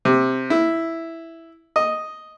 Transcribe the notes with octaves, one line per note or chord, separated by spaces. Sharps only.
C3
E4
D#5